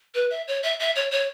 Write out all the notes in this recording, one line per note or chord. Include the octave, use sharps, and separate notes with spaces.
B4
E5
C#5
E5
E5
C#5
C#5